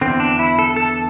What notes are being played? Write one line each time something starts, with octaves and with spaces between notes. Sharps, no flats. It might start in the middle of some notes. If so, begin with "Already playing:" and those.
E2 D3 C4
D4
E4
A4
A4